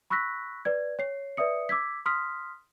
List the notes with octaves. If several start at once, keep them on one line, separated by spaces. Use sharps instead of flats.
B5 C#6 E6 F#6 A#6 B6
B4 D5 G#6
C#5 C7
B4 D5 E5 D#6 C#7
D6 E6 G#6 B6
C6 D#6 F6 B6